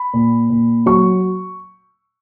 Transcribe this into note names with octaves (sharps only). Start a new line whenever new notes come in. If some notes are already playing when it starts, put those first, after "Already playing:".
Already playing: B5
A#2
A#2
F#3 C#6